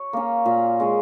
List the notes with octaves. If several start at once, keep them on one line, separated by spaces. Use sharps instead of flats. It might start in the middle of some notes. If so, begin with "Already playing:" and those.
Already playing: C#5
A#3 C#4
A#2
G#3 C#4